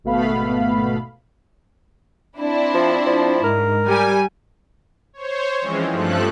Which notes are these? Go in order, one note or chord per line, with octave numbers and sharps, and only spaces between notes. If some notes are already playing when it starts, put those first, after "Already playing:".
G#1 B2 A3 B3 F5 B5
C4 D4 E4
F3
F3
G#2 A#4
G3 G#5
C5 C#5
E3 F3 G#3 C4 C#4
G2 F3 A3 A4 F#6